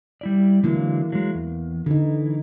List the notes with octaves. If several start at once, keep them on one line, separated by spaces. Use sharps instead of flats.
G3 E4 D5
D3 E3 F#3 G#3 A#3 E4
F#3 G#3
E2
D3 E3 D#4